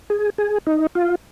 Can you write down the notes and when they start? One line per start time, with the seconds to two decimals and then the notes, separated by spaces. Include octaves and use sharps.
0.10 G#4
0.38 G#4
0.67 D#4
0.95 F4